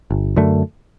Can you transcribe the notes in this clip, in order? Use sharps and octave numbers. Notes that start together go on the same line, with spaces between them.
G1
F#2 D3 A3